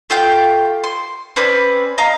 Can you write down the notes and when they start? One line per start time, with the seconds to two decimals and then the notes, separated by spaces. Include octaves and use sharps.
0.10 A3 F4 G4 G5
0.84 C6
1.36 C4 C#4 B4 D5
1.98 D#5 F5 A#5